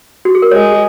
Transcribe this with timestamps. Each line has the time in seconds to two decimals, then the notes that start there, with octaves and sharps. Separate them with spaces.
0.25 F#4
0.35 G#4
0.42 A#4
0.51 G#3 C#5
0.72 G#4